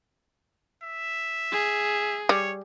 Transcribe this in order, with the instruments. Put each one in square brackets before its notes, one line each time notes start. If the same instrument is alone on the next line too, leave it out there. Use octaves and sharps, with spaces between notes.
[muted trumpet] E5
[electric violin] G#4
[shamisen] G3 [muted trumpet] C#5